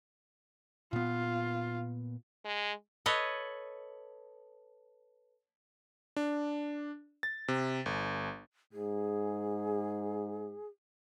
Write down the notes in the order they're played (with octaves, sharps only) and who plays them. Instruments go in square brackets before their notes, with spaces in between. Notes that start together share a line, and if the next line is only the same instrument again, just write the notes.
[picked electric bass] A#2 B3 [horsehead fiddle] F4
[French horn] G#3
[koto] A4 B4 C#5 D#5
[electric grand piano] D4
A6
C3
G1
[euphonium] G#2 [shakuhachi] G#4